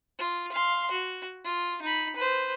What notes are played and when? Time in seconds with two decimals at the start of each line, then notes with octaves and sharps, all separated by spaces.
0.19 F4
0.52 F5 C6
0.91 F#4
1.45 F4
1.82 D#4 B5
2.16 B4 C5